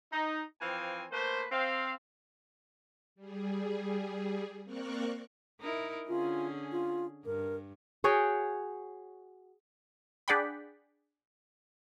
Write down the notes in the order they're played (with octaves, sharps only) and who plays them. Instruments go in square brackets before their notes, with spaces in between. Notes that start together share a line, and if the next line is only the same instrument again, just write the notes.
[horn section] D#4
E3 F3 C4 F5 G5 G#5
A3 A#3 B4 C5
C4 F5
[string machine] G3 G#4
A#3 C4 A#4 D5 C#6 F#6
[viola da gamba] D#4 E4 A#4
[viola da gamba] D3 C#4 G#4 [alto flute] F4
[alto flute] F4
[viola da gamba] G2 [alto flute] A#4
[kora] F#4 G#4 C#5 G5
[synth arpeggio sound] D4 G#4 D5 F#5 G5 B5